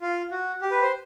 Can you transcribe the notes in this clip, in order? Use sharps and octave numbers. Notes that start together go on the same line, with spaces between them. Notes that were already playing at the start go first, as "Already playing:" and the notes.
F4
F#4
G4
B4
C5